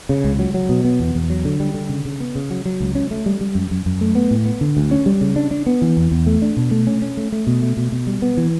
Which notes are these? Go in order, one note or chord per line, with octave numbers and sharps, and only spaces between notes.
C#3
C#2
F#3
F#3
B2
B3
E2
E2
F#3
D3
G3
D3
C#3
C#3
B3
C#3
F#3
F#3
C#2
C#4
A3
G3
G3
F#2
F#2
F#2
A3
B3
A2
B3
D3
D2
C#4
G3
C#3
D4
D4
B3
E3
E2
E2
A3
D4
B2
A3
C#4
C#4
A3
A3
B2
A3
B2
B2
G3
B3
E3